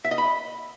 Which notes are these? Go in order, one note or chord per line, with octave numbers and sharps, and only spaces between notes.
E5
D#5
B5